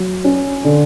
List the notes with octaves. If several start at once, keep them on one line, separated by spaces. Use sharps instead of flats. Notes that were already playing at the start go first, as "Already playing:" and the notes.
Already playing: F#3
C#4
D3